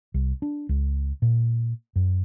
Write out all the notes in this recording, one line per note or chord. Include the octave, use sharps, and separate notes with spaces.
C2
D4
C#2
A#2
F#2